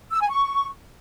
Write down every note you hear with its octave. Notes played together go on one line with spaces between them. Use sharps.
E6
G#5
C#6